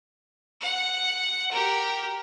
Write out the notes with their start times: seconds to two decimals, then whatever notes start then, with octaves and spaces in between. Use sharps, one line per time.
0.61 F#5
1.51 G4 A#4